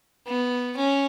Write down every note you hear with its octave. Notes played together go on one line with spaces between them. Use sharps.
B3
C#4